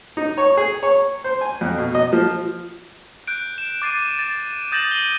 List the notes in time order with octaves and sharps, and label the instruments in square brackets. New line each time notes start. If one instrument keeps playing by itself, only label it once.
[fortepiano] D#4
C#5
G#4
C#5
C5
G#5
F2
B2
D#5
F3
[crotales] F#6 G6 D7
E7
D6 A6 C7 D#7
A6
D#6 G6 A6 A#6 E7 F#7
D#7 F#7 G7